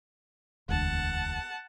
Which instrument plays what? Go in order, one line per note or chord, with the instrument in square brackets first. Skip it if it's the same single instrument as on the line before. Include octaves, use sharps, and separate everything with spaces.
[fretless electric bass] E1 D2 [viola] F#5 A5